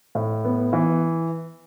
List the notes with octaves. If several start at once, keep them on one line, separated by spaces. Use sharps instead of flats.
A2
B3
E3